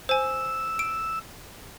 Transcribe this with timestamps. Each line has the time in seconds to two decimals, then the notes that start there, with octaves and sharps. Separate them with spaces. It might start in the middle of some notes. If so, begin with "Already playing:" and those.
0.09 C5 G#5 E6
0.79 D7